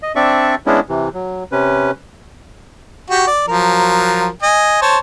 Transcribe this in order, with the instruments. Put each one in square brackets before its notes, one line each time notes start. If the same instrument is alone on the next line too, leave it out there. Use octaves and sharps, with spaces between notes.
[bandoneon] D#5
C4 D4 D5 E5 C#6
G#3 B3 C#4 D4 E4
C3 E3
F#3
C3 C#4 B4
[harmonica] F#4 G4
D5
F3 F#3 A#4
D#5 G#5
C5 C#5 A5